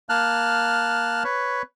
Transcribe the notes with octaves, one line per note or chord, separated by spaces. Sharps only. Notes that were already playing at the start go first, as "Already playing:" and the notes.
A#3 A5 F6 F#6
B4 C#5